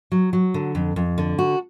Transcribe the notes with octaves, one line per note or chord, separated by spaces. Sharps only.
F#3
F#3
D3
F2
F2
D3
F#4